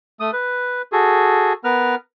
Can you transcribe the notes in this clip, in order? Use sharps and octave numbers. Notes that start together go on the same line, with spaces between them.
A3 D#6
B4
F#4 G#4 A4
B3 A#4 B4 F6